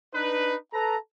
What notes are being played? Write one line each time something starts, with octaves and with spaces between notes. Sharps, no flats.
D4 D#4 B4
A4 B4 A#5